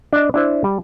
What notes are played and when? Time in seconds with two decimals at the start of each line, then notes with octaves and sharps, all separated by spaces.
0.13 D4 D#5
0.34 D4 E4 C5
0.64 G3